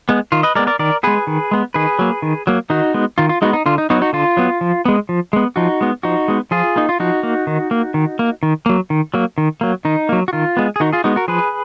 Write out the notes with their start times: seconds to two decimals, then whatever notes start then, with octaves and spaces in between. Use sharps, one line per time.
0.09 G#3 B3
0.32 D#3 F4
0.43 B4 D#5
0.55 G#3 B3 A#4 D5
0.67 A#4 D5
0.79 D#3 A#4 D5
1.03 G#3 B3 G#4 B4
1.27 D#3
1.51 G#3 B3
1.74 D#3 G#4 B4
1.99 F#3 A#3
2.22 D#3
2.47 F#3 A#3
2.70 D#3 D#4 F#4
2.94 G#3 B3
3.18 D#3 F4
3.29 F4
3.42 G#3 B3 D#4 F#4
3.53 D#4
3.66 D3 F4
3.78 D#4
3.90 F#3 B3 D#4 F#4
4.02 D#4 F#4
4.13 D3 F4
4.37 F#3 B3
4.61 F3
4.85 G#3 B3
5.09 F3
5.33 G#3 B3
5.56 F3 D#4 F#4
5.81 G#3 B3
6.03 F3 D#4 F#4
6.28 G#3 B3
6.51 F3 F4 G#4
6.76 A#3 D#4
6.89 F4
7.00 F3 D#4 F#4
7.23 A#3
7.47 D#3
7.71 A#3
7.94 D#3
8.19 A#3
8.43 D#3
8.66 F#3 A#3
8.90 D#3
9.14 F#3 A#3
9.38 D#3
9.61 F#3 A#3
9.85 D#3 D#4
10.09 F#3 A#3
10.28 F#4
10.33 D#3 F4
10.57 G#3 B3
10.76 G#4
10.80 D#3 D#4 F#4
10.93 F4 G#4
11.04 G#3 B3 D#4 F#4
11.16 F#4 A#4
11.28 F3 G#4 B4